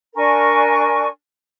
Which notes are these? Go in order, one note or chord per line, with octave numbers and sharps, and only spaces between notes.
D4 A#4 G#5 C#6